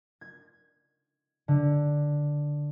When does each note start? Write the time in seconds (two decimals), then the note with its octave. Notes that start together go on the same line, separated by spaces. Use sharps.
0.21 G#6
1.48 D3